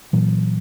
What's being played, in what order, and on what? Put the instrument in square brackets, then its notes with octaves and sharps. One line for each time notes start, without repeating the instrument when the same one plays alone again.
[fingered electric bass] A#2 E3 F#3